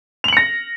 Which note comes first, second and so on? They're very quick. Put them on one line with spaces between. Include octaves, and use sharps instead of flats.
F7 F#7 C#7 A#6